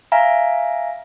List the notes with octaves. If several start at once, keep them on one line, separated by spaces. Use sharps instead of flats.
E5 F5 G#5 A#5